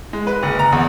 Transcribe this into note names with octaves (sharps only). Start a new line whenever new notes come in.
G#3
B4
F#1
A#5
E2